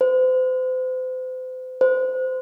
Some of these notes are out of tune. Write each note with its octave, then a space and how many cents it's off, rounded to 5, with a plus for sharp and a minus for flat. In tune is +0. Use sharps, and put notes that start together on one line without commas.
C5 -35
C5 -25